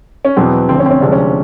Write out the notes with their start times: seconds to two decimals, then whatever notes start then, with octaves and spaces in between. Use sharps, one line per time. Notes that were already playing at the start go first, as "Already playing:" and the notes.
0.25 C#4
0.37 E2 B2 F#3 C4
0.68 D2 D3 F3 C4
0.80 C#4
0.86 C4
0.91 C#4
1.01 D2 C3 F3 G#3 D4
1.12 C#4